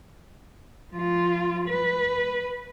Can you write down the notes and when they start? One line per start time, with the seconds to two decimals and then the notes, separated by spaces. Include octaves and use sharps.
0.92 F3 F4
1.68 B4